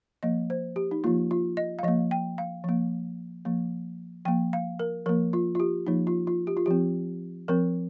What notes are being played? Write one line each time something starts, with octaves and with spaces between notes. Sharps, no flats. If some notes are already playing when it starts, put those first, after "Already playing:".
F3 A#3 D#5
C5
G4
D#4
F3 A#3 F4
F4
D#5
F5
F3 A#3 D#5
G5
F5
F3 A#3
F3 A#3
F3 A#3 G5
F5
A#4
F3 A#3 A#4
F4
F4
G4
F3 A#3 D#4
F4
F4
G4
F4
F3 C4 G4
F3 C4 A#4